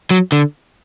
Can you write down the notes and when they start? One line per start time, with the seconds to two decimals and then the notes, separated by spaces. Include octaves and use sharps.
0.11 F#3
0.32 D3